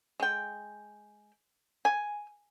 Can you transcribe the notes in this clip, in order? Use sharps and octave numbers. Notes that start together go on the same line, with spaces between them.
G#3 G5
G#5